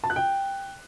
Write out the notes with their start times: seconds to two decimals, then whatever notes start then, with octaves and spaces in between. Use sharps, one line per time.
0.04 A5
0.10 F#6
0.16 G5